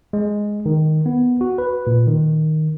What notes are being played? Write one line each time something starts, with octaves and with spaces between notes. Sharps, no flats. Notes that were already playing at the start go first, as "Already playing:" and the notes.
G#3
D#3
B3
F#4
B4
A#2
D#3